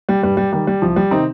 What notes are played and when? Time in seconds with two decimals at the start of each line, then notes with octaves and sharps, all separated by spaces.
0.09 G3
0.22 G2 G3
0.37 G3
0.53 D#3 G3
0.67 G3
0.82 C2 F3
0.96 G3
1.11 C3 D#3 C4 D#4